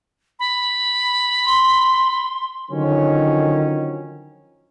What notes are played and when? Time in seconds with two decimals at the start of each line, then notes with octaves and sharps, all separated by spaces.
0.39 B5
1.45 C6
2.71 D3 D#3 F3 F#3 C#4